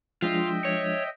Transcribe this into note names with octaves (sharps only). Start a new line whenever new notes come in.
F3 G#3 D4 F4 D#5 E5 G5
C#5